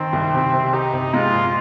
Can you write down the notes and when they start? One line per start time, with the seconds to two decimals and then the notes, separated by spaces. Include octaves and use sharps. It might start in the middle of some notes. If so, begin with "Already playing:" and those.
Already playing: D#3 C4
0.13 C2
0.34 C3
0.53 C3
0.73 D#4 G4
0.93 C3
1.14 G#3 F4
1.34 A#2